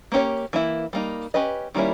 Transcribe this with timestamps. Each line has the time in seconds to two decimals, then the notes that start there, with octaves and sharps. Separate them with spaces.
0.12 A#3 C#4 G4 C#5
0.53 E3 A#3 E4
0.93 G3 A#3 D#4
1.34 C#4 G4 B4 D#5
1.74 D#3 G3 A#3 C#4 E4